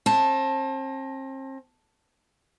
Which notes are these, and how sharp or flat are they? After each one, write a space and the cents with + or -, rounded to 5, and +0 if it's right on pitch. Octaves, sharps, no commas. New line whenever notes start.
C4 +40 A5 +0